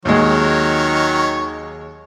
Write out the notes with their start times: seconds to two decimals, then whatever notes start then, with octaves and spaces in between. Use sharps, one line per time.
0.05 D#2 D#3 F#3 G#3 C#5